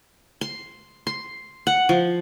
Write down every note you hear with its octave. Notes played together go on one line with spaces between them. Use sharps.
C6
C6
F#5
F3